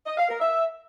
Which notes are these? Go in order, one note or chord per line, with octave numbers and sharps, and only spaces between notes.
D#5
F5
A#4
E5